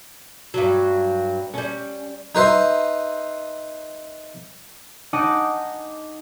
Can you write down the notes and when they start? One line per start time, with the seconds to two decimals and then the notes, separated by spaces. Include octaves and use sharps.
0.54 G2 F#3
1.54 G3 C#4
2.35 D#4 B4 C5 E5
5.13 D#4 D#5 F#5 G#5 A5 D6